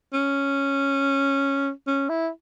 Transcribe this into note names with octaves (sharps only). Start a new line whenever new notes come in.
C#4
C#4
E4